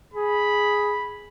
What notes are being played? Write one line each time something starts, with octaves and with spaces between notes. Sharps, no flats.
G#4 B5